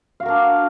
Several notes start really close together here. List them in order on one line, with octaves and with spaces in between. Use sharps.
F5 F#4 A#4 D4